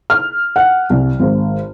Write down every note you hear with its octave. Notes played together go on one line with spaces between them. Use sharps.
F6
F#5
C2
G#1